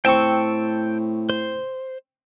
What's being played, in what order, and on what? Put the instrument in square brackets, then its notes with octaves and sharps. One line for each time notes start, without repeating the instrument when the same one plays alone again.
[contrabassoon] A2 [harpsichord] C4 C#6 [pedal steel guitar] G5 A5 E6
[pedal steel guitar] C5